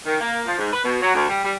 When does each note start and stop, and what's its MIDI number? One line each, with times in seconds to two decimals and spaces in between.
0.06 0.17 51
0.21 0.41 58
0.47 0.56 53
0.58 0.72 44
0.73 0.83 71
0.84 0.97 47
1.02 1.14 54
1.15 1.29 38
1.29 1.44 55
1.45 1.55 55